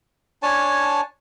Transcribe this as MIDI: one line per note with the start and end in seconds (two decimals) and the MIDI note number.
0.43 1.01 62
0.43 1.01 73
0.43 1.01 80
0.43 1.01 81